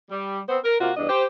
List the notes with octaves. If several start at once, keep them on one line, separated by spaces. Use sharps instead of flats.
G3
B3 C4 C5
A#4
C3 A#3 F4 F#4
E2 G2 D4 D#5
G4 C5